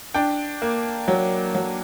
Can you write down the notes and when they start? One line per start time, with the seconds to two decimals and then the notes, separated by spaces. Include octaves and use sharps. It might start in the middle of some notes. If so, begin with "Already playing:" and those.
0.14 D4 G5
0.62 A#3
1.08 F#3
1.55 F#3